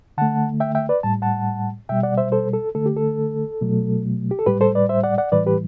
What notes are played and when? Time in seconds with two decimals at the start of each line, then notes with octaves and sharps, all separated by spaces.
0.18 D3 A3 F#5 A5
0.60 E5 G5
0.75 E5 G5
0.89 B4 D5
1.03 A2 G3 A5
1.22 F#5 A5
1.89 B2 G3 E5 G5
2.03 D5 F#5
2.17 C5 E5
2.32 A4 C5
2.53 A4
2.75 D3 A3 A4
2.86 G4
2.97 A4
3.61 B2 F#3 A3
4.31 G4
4.39 A4
4.46 A2 G3 G4 B4
4.61 A4 C5
4.75 B4 D5
4.89 C5 E5
5.03 D5 F#5
5.18 D5 F#5
5.32 A2 E3 G3 B4 D5
5.46 G4 B4